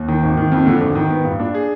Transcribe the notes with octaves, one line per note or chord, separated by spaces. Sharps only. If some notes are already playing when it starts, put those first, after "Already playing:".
Already playing: D#2
D#3
G#1
D#3
F2
D3
G#1
D#3
B3
G2
D4
G#4